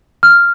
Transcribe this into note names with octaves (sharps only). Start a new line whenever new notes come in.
F6